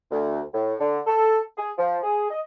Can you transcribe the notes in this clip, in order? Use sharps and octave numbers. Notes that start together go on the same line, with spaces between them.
D2
A2
D3
A4
G#4
F3
G#4
D#5